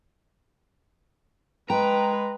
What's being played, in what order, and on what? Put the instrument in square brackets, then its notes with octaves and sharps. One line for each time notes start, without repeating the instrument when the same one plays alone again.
[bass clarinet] G#3 [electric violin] B4 [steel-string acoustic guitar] G5 [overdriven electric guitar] A#5